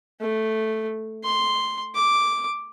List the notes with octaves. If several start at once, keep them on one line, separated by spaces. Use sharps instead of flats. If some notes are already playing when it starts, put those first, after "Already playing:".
A3
C6
D6